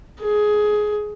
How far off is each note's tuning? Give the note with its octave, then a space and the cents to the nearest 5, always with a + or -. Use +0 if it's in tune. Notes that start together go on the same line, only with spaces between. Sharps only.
G#4 +15